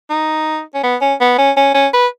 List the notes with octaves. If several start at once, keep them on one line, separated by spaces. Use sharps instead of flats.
D#4
C#4
B3
C#4
B3
C#4
C#4
C#4
B4